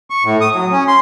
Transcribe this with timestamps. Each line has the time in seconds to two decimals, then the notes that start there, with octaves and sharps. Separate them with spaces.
0.10 C#6
0.24 A2
0.41 D#6
0.54 F#3
0.72 C#4
0.88 C6